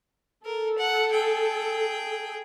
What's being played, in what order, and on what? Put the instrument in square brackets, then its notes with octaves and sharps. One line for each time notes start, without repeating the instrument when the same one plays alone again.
[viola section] A4 [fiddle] A#4
[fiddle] F#5
G#4 G5